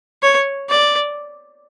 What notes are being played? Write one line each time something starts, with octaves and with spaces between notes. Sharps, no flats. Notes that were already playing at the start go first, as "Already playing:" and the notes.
C#5
D5